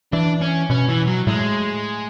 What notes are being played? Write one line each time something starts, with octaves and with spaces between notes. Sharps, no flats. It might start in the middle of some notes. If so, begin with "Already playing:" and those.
E3 D4
C#4
B2 C#4
E3
F#3
A2 G#3